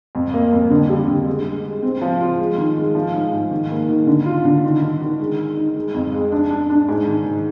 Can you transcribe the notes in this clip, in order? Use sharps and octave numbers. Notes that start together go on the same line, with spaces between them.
F2
A#3
F2
D3
G3
D3
G#3
G#3
G#3
C4
F3
F4
G#3
D#3
G#3
F3
G#2
G#2
D#3
A#3
D#3
D3
F4
D3
D#3
D#3
D#3
G#3
G#3
D#4
G#3
F2
G#3
D4
D4
D4
G#2
D#3
D#3